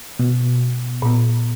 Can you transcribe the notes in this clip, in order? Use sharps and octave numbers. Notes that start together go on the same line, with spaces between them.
B2
A#2 B3